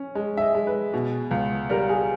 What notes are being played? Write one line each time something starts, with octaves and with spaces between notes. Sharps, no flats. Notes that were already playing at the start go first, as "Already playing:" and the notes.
Already playing: C#4
G#3
E5
D#5
G#3
B4
B2
C#2
G3 A#4
G#4